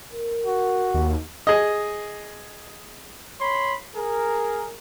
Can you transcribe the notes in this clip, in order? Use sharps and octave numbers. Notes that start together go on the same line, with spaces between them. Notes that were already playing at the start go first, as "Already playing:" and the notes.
A#4
F#4
D#2
G#4 D#5
C#5 B5 C6
G#4 A#4